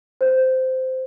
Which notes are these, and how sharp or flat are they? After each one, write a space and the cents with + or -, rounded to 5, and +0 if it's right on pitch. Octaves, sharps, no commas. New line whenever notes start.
C5 -15